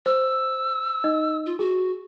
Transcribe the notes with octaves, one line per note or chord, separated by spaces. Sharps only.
C5 E6
D#4 D#5
F4
F#4 G#4